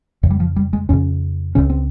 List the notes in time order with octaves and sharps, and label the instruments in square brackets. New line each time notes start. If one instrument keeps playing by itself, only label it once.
[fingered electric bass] F2 C#3
G3
F3
G3
G#3
F2 C#3 C#4
C#2 C#3 C#4
C4